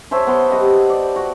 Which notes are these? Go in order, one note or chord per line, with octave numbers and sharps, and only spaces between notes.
C5 C#5 E5 A5
B3 C6
G4 D#5 F#5
D5
F#4